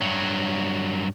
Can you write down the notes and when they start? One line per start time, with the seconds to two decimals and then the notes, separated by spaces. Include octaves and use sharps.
0.01 G2 F#3